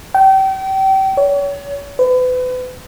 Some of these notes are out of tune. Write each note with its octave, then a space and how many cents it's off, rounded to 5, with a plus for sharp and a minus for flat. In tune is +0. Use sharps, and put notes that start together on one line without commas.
G5 -30
C#5 +35
B4 +35